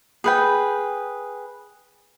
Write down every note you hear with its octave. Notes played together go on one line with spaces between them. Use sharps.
G#4 B4 G5